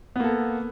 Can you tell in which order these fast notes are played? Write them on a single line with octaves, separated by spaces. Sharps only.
B3 A#3 A4